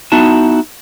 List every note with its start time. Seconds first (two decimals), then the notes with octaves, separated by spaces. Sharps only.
0.12 B3 D#4 E4 F#4 A5